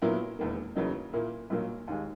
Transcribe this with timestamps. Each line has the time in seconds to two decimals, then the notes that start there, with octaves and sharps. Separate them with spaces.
0.02 A#2 F#3 B3 E4 A#4
0.39 E1 E2 D#3 A#3
0.76 E2 C#3 F#3 A#3 D#4
1.13 A#2 A#3 E4 A#4
1.50 B1 A#2 F#3 A#3
1.88 D#2 D#3 G#3